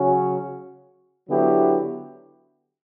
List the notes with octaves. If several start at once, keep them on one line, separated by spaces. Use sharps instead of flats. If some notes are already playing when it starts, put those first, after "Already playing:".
Already playing: C#3 F#3 C#4 F#4
D3 F#3 B3 E4 G4